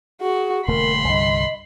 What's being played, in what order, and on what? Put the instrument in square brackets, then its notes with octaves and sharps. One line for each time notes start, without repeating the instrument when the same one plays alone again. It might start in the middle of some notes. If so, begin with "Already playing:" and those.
[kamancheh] F#4 [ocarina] G#4
[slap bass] D#1 C#3 A3 [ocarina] A#4 [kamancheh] B5 C6
[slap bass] C2 G2 D3 [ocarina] D#5